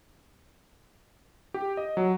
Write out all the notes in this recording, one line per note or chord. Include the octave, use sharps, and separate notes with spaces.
G4
D#5
F#3